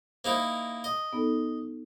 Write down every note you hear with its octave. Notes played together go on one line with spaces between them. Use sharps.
A#3 D#4 E4 C5
D#5
B3 D#4 A4